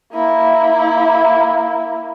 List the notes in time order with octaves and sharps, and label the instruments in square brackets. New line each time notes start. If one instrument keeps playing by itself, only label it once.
[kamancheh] A#3 E4